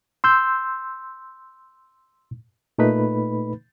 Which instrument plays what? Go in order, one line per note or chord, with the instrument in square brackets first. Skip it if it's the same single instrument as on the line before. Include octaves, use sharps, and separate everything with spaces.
[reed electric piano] C6 E6 G6
A#2 A3 D#4 B4 B5